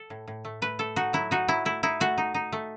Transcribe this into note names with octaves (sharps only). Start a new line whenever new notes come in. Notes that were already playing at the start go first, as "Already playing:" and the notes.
Already playing: A4
A2
A2
A3
A3 B4
A3 A4
D#4 F#4
F#3 E4
D#4 F#4
F#3 E4
A3 E4
D#4 E4
A3 F#4
D#4
D#4
A3